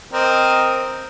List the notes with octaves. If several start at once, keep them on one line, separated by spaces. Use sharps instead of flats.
C4 A#4 D#5